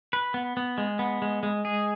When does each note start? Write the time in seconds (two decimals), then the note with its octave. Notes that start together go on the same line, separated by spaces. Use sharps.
0.13 B4
0.34 B3
0.57 B3
0.78 G#3
0.99 B3
1.22 G#3
1.43 G#3
1.65 G#4